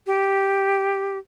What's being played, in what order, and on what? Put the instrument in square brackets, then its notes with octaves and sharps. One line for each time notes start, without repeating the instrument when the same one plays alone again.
[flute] G4